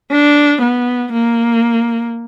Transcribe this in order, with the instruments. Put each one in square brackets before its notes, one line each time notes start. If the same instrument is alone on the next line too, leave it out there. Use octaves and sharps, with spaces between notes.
[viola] D4
B3
A#3